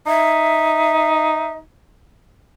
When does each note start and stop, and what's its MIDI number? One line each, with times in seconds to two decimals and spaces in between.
0.07 1.60 63
0.07 1.56 76